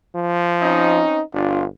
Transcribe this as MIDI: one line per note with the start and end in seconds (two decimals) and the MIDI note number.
0.15 1.02 53
0.62 1.20 60
0.62 1.20 61
0.62 1.20 63
1.33 1.67 31
1.33 1.63 62
1.33 1.63 65